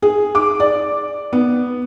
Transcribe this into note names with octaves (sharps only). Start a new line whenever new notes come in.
G#4
D6
D5
B3